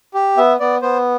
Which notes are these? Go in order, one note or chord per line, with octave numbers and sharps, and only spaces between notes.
G4
B3 E5
B3 D5
B3 C5